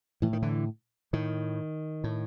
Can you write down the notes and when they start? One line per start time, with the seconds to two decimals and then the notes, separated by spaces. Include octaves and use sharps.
0.22 A2 E3
0.33 D#3
0.42 D3 E3
1.13 A2 D#3
2.04 A2